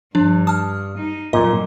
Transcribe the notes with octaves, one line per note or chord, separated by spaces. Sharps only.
G2 F3 D4
A5 D#6 F6
D#4
F2 A#2 F#3 D#5